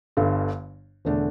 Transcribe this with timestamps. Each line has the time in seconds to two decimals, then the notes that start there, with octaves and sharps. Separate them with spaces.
0.17 G1 G2 D3
1.05 E1 D3 A3 D4